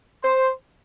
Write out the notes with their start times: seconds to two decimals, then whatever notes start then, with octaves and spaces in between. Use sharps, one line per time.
0.23 C5